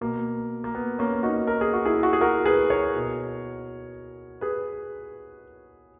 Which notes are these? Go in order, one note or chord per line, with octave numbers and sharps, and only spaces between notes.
B2 A#3
A#3
B3
A#3 C#4
D#4 F#4
A#4
G#4
F#4
E4 G#4
F#4
G#4
F#4 A#4
G#4 B4
A#4 C#5
B2
G#4 B4